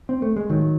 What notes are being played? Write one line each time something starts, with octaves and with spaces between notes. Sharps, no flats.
C4
A3
G#3
A1 D#3 F#3